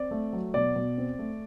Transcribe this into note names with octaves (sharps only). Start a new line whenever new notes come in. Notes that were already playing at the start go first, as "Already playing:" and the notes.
Already playing: C4 D5
A3
F#3
B2 D5
B2
C4
A3